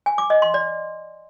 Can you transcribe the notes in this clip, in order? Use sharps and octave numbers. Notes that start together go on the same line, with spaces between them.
G#5
D6
D#5
C6
D5